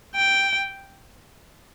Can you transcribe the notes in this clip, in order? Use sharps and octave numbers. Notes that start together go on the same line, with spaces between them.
G5